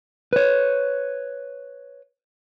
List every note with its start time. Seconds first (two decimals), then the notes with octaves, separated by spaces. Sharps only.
0.33 B4 C#5